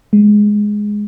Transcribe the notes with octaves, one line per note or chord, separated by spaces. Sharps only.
G#3